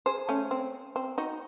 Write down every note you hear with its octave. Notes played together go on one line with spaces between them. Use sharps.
G#4 C5
A3 C#4
C4
C4
D#4 F#4